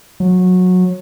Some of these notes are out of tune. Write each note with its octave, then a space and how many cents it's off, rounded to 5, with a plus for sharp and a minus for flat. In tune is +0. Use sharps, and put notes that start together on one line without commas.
F#3 -20